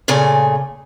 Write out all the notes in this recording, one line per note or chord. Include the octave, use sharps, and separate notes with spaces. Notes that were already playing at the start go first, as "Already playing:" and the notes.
A#2 C#3 A3 G#5